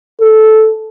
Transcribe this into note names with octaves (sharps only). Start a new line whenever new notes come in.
A4